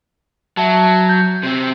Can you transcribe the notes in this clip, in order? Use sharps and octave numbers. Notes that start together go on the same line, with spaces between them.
F#3 E5 A5
G6
C3 C4